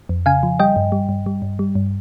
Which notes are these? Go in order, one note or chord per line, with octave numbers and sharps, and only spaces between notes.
F2
C#3 F5 G#5
F3
G3 D#5 G5
G2
G3
G2
G3
G2
G3
G2